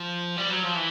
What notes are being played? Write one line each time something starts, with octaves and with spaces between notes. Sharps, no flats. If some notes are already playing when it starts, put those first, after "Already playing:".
Already playing: F3
G3
F#3
F3
E3